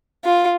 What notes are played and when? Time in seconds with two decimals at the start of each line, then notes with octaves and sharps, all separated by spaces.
0.25 F4